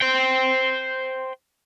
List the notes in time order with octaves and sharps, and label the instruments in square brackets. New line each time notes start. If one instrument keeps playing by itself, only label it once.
[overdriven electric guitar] C5 G5